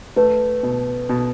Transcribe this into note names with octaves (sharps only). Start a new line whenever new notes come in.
A3 B4
B2
B2